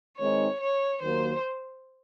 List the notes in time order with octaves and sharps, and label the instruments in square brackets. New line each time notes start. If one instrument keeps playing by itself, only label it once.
[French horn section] D#3 G#3 C4 D#4 [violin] C#5
[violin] C#5
[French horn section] D#2 D#3 F#3 A#3 [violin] C5